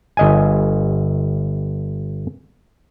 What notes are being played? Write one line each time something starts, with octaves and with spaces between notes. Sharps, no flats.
G1 D#5 G#5